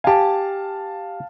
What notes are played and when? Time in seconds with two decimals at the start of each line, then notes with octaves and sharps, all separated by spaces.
0.04 G4 F5 G#5 A5